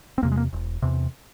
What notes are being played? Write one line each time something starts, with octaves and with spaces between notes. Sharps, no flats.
C4
E2 C3 A#3
G#3
A#3
E1
E2 C3